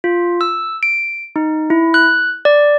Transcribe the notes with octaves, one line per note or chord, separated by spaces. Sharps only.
F4
E6
D7
D#4
E4
F#6
D5